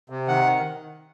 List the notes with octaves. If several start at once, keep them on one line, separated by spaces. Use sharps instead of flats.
C3
D#3 F#5